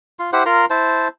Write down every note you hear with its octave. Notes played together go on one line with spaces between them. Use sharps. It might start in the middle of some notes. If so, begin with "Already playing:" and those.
F4 C6
E4 G4 C5 F#5
F4 A#4 A#5 C6
E4 C5 A5